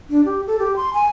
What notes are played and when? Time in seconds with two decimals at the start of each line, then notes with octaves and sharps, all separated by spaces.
0.10 D4
0.25 G4
0.47 A4
0.59 G4
0.76 C6
0.94 G#5